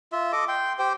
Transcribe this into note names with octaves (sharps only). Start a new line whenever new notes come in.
F4 E5
A4 D#5 D6
G5 C6
G4 C5 G5